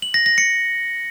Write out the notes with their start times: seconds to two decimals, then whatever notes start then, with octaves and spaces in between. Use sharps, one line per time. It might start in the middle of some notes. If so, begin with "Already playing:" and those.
0.02 F#7
0.14 A#6
0.26 A#6
0.38 C#7